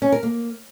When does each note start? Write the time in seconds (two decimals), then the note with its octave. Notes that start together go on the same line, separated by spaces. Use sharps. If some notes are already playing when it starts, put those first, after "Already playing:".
0.02 C#4
0.12 A#4
0.23 A#3